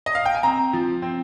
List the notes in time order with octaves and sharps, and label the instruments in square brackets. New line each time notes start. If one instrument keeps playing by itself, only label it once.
[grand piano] D#5
F5
G5
G#5
C4 A#5
F3
C4